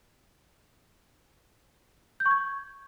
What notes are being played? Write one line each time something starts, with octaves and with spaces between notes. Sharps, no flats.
G6
C#6
G#6